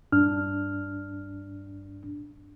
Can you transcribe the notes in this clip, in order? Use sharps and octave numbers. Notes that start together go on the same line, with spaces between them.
G2 D4 F6